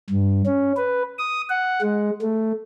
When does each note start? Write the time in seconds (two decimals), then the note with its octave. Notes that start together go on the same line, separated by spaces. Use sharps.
0.10 G2
0.46 C#4
0.77 B4
1.19 D#6
1.49 F#5
1.82 G#3
2.22 A3